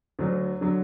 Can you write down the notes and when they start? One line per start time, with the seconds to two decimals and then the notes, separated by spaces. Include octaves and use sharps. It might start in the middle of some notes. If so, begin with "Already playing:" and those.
0.19 D2 D3 F#3
0.61 D3 F#3